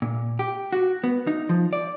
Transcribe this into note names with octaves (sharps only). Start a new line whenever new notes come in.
A#2
G4
F#4
B3
D#4
F3
D5